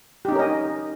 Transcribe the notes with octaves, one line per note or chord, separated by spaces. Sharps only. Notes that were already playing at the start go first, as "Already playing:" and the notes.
C#4 D#4 G4 A#4 D#5